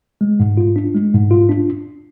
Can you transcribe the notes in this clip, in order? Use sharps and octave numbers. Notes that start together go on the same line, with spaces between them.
G#3
G#2
F4
D4
G#3
G#2
F4
D4